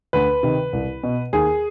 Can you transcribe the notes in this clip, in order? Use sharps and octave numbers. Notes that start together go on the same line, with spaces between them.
D2 B4
C3 D#3
C2
B2
D#2 G#4